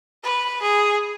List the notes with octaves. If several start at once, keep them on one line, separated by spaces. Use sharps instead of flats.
B4
G#4